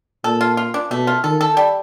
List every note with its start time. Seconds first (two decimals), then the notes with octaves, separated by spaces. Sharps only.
0.24 A#2 A4
0.41 F4
0.57 F4
0.74 D4
0.91 B2 A3
1.07 F4
1.24 D#3 A4
1.41 A4
1.57 G3